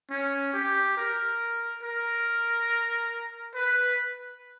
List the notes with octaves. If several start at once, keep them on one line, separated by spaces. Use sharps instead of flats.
C#4
G4
A#4
A#4
B4